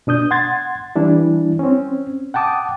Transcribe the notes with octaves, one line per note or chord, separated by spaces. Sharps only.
B2 D4 D#6 G6
F#5 C6 G#6 A6
E3 G3 D4 E4
C4 C#4
F#5 G5 A5 D6 D#6